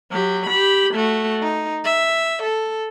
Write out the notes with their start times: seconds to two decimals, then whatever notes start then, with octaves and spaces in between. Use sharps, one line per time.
0.11 F#3 G4
0.46 G4 B5
0.94 A3 F#4
1.42 D#4
1.84 E5
2.43 A4